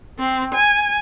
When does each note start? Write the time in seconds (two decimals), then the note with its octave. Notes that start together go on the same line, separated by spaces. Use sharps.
0.19 C4
0.54 G#5